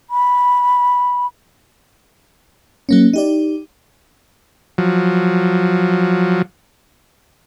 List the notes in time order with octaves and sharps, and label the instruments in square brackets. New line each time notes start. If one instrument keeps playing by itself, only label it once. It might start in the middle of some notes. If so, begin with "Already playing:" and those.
[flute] B5
[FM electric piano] F#3 A#3 C#4
D#4 G4 D5
[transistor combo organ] F3 F#3